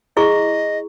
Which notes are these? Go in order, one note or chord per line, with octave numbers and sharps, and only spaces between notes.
E4 G#4 D#5 C#6